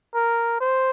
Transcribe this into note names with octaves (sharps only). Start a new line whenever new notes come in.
A#4
C5